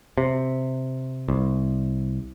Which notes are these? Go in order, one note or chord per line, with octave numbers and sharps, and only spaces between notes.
C3
C2